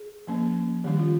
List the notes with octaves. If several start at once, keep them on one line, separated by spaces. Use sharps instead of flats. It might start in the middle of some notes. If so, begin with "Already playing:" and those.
Already playing: G#4
F3 A#3 C#4
D#3 G3 C#4 G4
F4